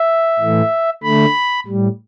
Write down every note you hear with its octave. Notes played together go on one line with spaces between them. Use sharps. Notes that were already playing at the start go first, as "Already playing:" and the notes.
Already playing: E5
A2 E3 A3
D3 A3 B5
A2 G3